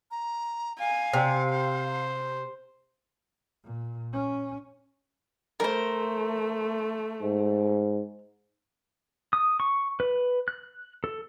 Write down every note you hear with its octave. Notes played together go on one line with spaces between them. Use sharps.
A#5
F5 G#5
C3
C5
A#2
C#4
A3 A#4 C5
G#2
D#6
C#6
B4
F#6
A4